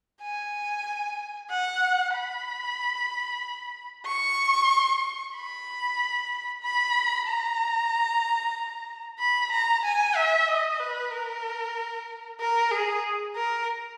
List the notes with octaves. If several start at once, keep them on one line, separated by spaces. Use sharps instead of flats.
G#5
F#5
B5
C#6
B5
B5
A#5
B5
A#5
G#5
E5
D#5
B4
A#4
A#4
G#4
A#4